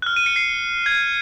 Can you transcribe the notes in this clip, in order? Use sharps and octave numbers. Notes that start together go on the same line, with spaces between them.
F#6
F6
D#7
C#7
C7
G#6